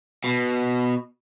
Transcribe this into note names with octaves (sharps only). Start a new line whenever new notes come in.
B2